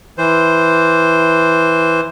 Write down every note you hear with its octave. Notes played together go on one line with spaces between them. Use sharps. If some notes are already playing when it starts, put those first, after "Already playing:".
E3 C5